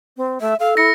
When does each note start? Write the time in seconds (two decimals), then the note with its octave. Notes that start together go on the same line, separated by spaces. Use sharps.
0.17 C4
0.41 A3 E5
0.60 A4 F5
0.77 E4 A#6 C#7